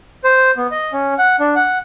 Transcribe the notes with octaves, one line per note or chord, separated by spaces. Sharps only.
C5
B3
D#5
C#4
F#5
D4
F#5